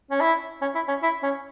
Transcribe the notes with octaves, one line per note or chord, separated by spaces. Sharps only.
C#4
E4
C#4
E4
C#4
E4
C#4